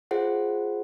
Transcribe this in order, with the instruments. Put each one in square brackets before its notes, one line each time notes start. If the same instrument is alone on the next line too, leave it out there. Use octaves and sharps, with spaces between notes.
[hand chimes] F4 G#4 C5 F#5